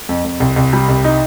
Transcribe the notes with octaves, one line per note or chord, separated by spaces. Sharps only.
F2
F2
C2
C2
G3
C2
D#4